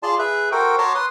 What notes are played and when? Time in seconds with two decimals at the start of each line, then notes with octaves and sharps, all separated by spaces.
0.03 F4 G#4 D5 A5 C6
0.19 G#4 B4 E5
0.52 F#4 A4 A#4 C5 G5
0.78 F#4 C#5 A5 A#5 C6 D6
0.95 B4 C6 D#6